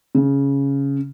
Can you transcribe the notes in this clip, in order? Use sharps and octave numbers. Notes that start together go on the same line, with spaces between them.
C#3